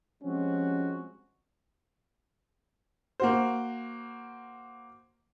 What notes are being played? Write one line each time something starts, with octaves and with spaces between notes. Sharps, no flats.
F3 G3 G#3 C4 C#4 F#4
A#3 F#4 C5